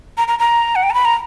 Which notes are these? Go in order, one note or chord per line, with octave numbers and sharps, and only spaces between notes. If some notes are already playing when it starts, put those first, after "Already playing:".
A#5
A#5
A#5
F#5
G5
A#5
B5
A#5